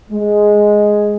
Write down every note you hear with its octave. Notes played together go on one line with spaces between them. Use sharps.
G#3